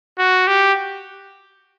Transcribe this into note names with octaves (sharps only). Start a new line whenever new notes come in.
F#4
G4